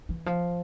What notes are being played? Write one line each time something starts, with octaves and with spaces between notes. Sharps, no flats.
E3
F3